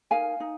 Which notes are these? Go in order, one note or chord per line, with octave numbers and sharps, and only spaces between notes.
D#4 A#4 F5 G#5
D#4